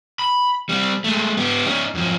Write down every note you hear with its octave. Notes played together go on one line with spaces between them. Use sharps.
B5
G3 C4
G#3 A3
B3 G4
C#4 D#4
F#2 F3